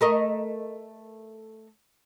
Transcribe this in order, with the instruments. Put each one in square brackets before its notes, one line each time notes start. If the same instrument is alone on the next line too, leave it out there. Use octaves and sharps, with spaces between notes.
[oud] A3 A#4 D#5